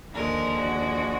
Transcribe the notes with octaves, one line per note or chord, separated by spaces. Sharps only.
D#2 D3 F3 G#3 A#4
F#4